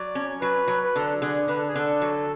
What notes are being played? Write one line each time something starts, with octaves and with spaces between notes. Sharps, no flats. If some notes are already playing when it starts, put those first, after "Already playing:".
Already playing: F#3 D5
C#4
F#3 B4
F#3
B4
D3 A4
D3 G#4
D3 B4
A4
G#4
D3 A4
F#3